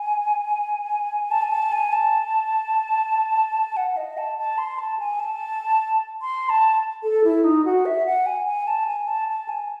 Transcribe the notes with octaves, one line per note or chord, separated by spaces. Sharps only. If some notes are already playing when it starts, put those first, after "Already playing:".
Already playing: G#5
A5
G#5
A5
G#5
A5
F#5
D#5
A5
A5
C6
A5
G#5
A5
C6
A5
A4
E4
D#4
F#4
E5
F#5
G#5
G#5
A5
G#5
A5
A5
G#5